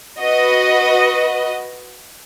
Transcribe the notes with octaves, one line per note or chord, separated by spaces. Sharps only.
F#4 B4 D#5